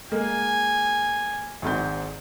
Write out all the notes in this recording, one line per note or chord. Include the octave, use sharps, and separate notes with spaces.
G#3 A#3 G#5
G#1 G#2 G6